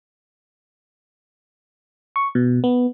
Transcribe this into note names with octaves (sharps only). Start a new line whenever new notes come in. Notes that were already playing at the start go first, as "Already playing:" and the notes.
C#6
B2
B3